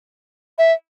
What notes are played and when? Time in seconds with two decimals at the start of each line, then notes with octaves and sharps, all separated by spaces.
0.58 E5